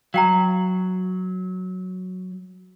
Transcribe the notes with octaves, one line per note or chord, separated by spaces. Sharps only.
F#3 F5 G5 A#5